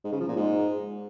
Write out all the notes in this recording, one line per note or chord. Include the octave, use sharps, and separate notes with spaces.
G#2
C#3
F3
A#2
G#2